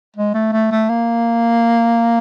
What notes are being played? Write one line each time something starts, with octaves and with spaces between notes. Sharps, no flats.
G#3
A3
A3
A3
A#3